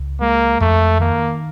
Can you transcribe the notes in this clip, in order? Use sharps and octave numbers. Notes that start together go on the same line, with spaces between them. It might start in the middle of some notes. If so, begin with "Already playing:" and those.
Already playing: C#2
G#3 A#3
F2 A3
D#3 A#3